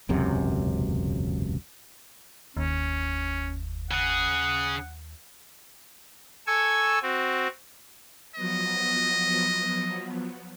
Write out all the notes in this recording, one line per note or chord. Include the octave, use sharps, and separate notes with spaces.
E1 C#2 F#2 C3
F#1 D#2 C#4
C#3 G#4 F#5
A4 G#5 C#6 E6 G#6
C4 F#4
F3 F#3 B3 D#5